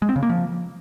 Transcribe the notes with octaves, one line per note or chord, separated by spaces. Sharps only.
G#3
C4
C#3
A#3
F3